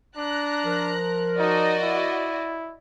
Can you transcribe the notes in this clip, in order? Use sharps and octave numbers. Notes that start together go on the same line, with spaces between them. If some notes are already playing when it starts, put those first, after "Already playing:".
D4 A#5 F#6
F3 A#4
D#4 F#4 D5 D#5
E4